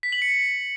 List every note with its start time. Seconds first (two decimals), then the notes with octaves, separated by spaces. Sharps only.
0.03 B6
0.12 F#7
0.22 C#7